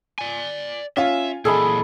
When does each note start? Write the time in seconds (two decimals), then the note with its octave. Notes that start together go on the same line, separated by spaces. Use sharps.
0.18 D5 G#5
0.97 C#4 F4 E5 G#5
1.45 A#2 E3 G#4 A4 D#5 B5